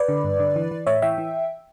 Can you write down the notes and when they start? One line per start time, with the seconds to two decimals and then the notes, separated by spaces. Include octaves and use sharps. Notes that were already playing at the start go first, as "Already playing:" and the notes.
Already playing: B4 D5
0.09 D3
0.24 G2
0.39 D3
0.56 E3
0.71 E3
0.87 A2 C#5 E5
1.02 E3 E5 G5
1.18 E3